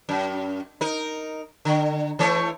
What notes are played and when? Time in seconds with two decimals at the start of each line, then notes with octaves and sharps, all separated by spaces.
0.09 F#2
0.81 D#4 A#4
1.65 D3
2.19 E3 A3 C#5